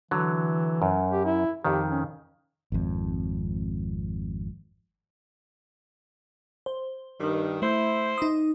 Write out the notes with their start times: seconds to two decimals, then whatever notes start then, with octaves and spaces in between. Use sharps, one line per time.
0.11 D3 E3 F#3
0.82 F#2
1.11 G4
1.25 E4
1.65 F2 D#3 G4
1.90 C#4
2.72 G#1 F2
6.66 C5
7.21 G2 D#3
7.62 A3 E4 C5 G6
8.18 D#4 D#6